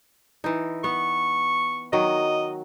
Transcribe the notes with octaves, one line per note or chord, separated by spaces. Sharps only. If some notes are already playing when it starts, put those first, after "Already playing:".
E3 D#4
B3 C#6
D#3 F#3 D#5